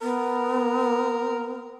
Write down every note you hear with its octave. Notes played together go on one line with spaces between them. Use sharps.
B3 A#4